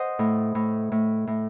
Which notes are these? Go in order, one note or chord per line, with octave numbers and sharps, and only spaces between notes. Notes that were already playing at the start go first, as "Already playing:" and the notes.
Already playing: C5 D#5 F#5
A2
A2
A2
A2